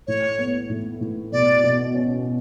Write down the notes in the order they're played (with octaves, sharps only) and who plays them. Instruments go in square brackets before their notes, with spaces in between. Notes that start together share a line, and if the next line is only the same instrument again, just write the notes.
[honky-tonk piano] A2 [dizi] C#5
[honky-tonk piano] B3
A2
A2
[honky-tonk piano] B2 [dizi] D5
[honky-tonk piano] B2
C#4